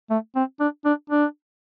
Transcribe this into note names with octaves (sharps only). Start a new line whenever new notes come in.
A3
C4
D4
D4
D4